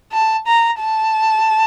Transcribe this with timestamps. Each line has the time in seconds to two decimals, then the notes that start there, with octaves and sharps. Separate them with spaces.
0.12 A5
0.46 A#5
0.80 A5